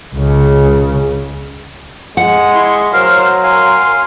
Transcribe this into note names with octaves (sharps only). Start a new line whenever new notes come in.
C#2 C#3
G#3 F#5
E4 C6 C#6
F#3 A#4 C5 F5
A#4 F5 G#5 C6